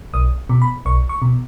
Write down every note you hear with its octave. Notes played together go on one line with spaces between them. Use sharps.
B1 D#6
B2
B5
B1 C#6
C#6
B2